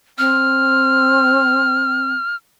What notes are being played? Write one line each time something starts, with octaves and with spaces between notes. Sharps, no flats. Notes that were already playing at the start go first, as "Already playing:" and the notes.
C4 F6